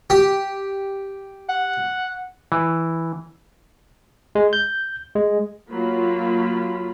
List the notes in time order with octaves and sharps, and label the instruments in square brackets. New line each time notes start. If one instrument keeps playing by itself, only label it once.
[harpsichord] G4
[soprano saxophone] F#5
[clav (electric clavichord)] E3
[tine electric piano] G#3
G6
G#3
[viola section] F#3 A#3 F4 B5